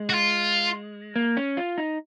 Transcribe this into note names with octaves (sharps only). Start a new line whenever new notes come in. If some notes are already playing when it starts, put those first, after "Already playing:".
Already playing: G#3
F#4
F4
A#3
C#4
F4
D#4